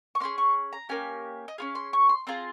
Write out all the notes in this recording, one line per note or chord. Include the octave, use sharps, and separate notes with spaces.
C#6
A#3 C#4 G#4 C6
C#6
A#5
A#3 C#4 G4 G#5
D#5
C#4 F4 G#4 F5
C6
C#6
C6
C4 F4 G#4 A#5